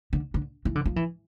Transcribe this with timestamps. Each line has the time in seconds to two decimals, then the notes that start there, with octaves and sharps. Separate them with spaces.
0.13 D3
0.34 D3
0.65 E3
0.75 D3
0.86 F3
0.96 E3